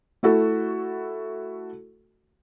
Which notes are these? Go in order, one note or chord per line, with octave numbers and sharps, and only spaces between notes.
A3 E4 F#4 A4